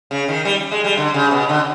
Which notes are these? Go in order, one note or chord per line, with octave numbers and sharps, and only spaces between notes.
C#3
D#3
G3
G#3
G3
D3
C#3
B2
D3